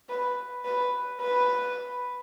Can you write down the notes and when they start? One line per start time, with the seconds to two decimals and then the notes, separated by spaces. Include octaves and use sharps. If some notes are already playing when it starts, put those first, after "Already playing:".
0.09 B4
0.65 B4
1.21 B4